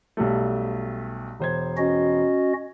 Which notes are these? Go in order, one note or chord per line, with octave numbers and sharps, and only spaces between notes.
B1 G3 A3
E1 C5 G#6
C#4 F#4 D#5